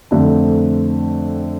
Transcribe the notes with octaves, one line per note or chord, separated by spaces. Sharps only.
F2 D3 A3 C4